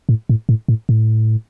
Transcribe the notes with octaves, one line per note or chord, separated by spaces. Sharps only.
A2
A2
A2
A2
A2